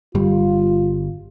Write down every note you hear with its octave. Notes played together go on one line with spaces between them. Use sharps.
G1 G3 F4